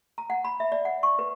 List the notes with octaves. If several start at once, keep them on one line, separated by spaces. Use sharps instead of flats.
A#5
F#5
B5
E5
D5
F#5
C#6
B4